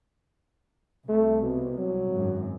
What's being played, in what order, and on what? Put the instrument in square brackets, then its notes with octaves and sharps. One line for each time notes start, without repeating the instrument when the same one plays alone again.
[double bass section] C2 [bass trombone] A3
[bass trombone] B2
F#3
[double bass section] G#1 F#2